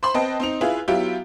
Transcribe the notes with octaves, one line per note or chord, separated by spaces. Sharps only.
C5 B5 C6
C4 B4 D#5 G5 A5
C4 D#4 F7
E4 F4 G#4 B4
F#3 B3 E4 F4 G4